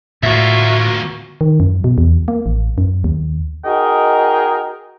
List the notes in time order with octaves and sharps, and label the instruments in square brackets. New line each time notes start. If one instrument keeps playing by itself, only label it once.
[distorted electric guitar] D2 A#3 [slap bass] A2 [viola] F4 F#4 [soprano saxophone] E5
[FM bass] D#3
F#2
B2
E2
A#3
A1
F#2
D#2
[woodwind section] D#4 F#4 G#4 A#4 D#5 G5